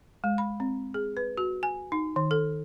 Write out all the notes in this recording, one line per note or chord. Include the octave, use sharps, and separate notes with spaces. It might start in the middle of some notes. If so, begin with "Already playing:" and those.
G#3
B5
C4
G#4
B4
F#4
G#5
D#4
D#3
A4